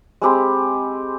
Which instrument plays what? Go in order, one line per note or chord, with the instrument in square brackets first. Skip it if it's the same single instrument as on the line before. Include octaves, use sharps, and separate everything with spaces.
[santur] G#3 C4 G4 B5